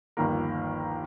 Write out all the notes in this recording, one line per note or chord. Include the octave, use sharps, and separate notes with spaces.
G1 D#2 D#3 F3 A#3 A#4